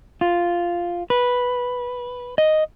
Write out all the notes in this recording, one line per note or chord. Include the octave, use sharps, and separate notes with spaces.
F4
B4
D#5